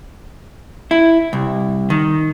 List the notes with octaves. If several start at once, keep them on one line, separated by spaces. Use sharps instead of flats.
E4
C2
D#3